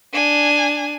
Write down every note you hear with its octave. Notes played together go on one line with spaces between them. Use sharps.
D4 G#5